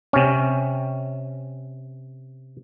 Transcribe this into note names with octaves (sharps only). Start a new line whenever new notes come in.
C3 C#4